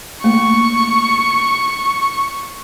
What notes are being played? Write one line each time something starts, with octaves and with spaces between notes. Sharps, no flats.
A3 A#3 C#6